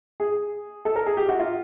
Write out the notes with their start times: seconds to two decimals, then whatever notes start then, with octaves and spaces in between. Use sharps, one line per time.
0.20 G#4
0.85 A4
0.96 A#4
1.07 G#4
1.17 G4
1.29 F#4
1.39 F4